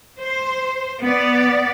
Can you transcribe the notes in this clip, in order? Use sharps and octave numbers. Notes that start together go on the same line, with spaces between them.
C5
B3 D5